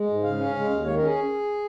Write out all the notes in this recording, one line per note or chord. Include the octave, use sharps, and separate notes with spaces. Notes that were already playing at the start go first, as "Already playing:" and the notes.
Already playing: G#3
G#2
C#3 F5
C#4
G#3
D#2
D#3 C#5
C#4 A#4
G#4